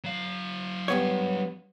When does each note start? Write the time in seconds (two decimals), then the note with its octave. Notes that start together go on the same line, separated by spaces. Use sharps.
0.04 F#3 F5
0.88 G2 B3 C#5